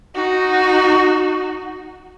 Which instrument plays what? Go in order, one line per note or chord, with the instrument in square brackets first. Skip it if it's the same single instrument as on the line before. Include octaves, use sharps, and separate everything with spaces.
[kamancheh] D#4 F#4